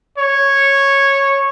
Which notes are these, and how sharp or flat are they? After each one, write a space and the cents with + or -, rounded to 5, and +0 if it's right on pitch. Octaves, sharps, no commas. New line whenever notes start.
C#5 -10